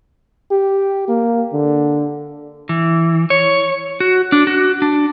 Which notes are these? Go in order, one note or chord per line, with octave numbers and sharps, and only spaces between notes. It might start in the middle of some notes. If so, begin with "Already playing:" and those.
G4
A#3
D3
E3
C#5
F#4
D4
F#4
D4